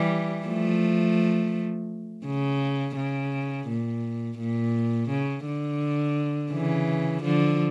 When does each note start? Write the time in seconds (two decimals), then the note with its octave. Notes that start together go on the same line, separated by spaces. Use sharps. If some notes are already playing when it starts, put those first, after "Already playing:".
Already playing: E3 G3
0.47 F3 A3
2.26 C#3
2.96 C#3
3.68 A#2
4.38 A#2
5.10 C#3
5.46 D3
6.52 C#3 E3
7.23 D3 F3